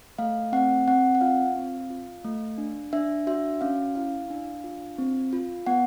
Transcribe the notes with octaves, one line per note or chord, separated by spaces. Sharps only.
A3 F5
C4 F#5
C4 F#5
F#5
F4 F5
C4
F4
A3
D4
D4 E5
F#4 E5
C#4 F5
E4 F5
D4
F4
C4
F4
B3 F#5